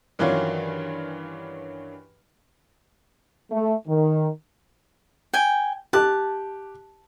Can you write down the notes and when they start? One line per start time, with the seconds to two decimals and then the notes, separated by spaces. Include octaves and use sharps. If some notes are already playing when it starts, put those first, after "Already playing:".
0.19 G2 D#3 E3 F#3 C#4 F4
3.51 A3
3.87 D#3
5.34 G5 G#5
5.93 G4 A5 F#6